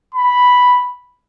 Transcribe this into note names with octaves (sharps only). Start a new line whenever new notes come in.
B5